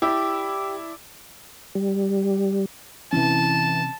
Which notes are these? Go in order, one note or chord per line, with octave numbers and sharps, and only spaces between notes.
E4 G4 D5 E5 A5
G3
C3 E3 C4 C#4 A5